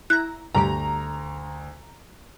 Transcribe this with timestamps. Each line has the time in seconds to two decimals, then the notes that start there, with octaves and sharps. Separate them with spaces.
0.10 E4 A#5 F#6
0.55 D2 G2 G3 G4 A#5